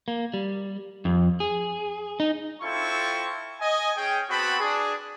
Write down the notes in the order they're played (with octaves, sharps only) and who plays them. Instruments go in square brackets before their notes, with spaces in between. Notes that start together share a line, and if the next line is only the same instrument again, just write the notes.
[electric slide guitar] A#3
G3
F2
G#4
D#4
[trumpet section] C4 E4 F4 A4 C#6
D#5 G#5
C#4 G#4 G5
B3 C4 F#4 A5 B5
D4 G#4